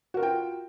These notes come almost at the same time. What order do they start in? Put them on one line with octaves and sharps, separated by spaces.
F#4 A#4 F4 G5